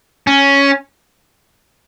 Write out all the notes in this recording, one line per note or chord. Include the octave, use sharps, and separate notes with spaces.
C#4